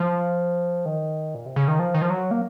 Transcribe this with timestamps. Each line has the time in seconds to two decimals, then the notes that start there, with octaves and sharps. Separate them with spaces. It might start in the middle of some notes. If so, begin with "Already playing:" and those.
Already playing: F3
0.85 D#3
1.35 A#2
1.46 C3
1.56 C#3
1.68 D#3
1.79 F3
1.95 D#3
2.02 F3
2.10 F#3
2.31 A#3